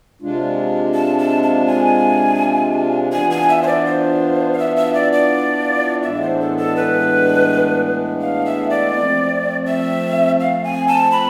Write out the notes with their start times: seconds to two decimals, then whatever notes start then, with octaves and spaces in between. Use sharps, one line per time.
0.22 C3 G#3 D4 F4
0.95 A5
1.19 A5
1.43 A5
1.67 G#5
3.12 E3 B3 D4 F4 G#5
3.31 G#5
3.49 E5
3.63 C5
3.67 D5
3.86 C5
4.53 F5
4.58 E5
4.77 E5
4.94 D5
5.13 D5
6.03 A2 E3 G#3 B3 D4 E5
6.22 C5
6.40 A4
6.58 A4
6.76 B4
8.21 F5
8.46 E5
8.70 D5
8.94 F3 A3 C4
9.66 E5
10.40 F5
10.64 G#5
10.88 A5
11.12 B5